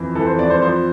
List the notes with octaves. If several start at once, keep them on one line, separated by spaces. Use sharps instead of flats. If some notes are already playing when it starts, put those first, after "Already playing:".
Already playing: F2 E3
E3 A4
C5
F2 D5
C5
F3 C5